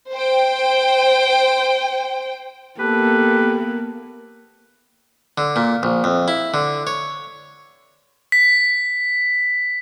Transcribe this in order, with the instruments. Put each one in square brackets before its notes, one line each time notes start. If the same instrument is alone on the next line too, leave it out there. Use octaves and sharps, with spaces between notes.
[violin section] C5 G5
[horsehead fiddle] A#3 B3 [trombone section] G4 A4 [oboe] B4
[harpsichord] D3
A#2
A#1
F2
E4
D3
C#5
[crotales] B6